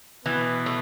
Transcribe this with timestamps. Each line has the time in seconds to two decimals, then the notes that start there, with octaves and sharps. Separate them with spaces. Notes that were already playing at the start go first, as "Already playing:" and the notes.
0.25 B2 E3 B3
0.66 A3